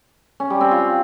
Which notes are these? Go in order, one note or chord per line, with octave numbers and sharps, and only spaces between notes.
C#4
G3
C4
F4